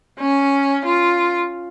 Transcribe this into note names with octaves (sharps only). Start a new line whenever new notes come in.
C#4
F4